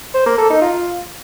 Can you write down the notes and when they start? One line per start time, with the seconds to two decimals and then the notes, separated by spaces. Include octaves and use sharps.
0.14 C5
0.26 A#3
0.38 A4
0.50 D#4
0.62 F4